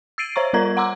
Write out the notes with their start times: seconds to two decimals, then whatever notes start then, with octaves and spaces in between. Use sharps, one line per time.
0.18 E6 A6 C7 D7 D#7
0.36 C5 C#5 A#5 C#6
0.53 G3 F4 A#4 D5 A#5 G#6
0.77 F#5 A#5 C6 D6 E6